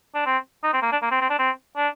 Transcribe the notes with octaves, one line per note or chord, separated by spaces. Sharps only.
D4
C4
D#4
C4
A#3
D4
A#3
C4
C4
D4
C4
D4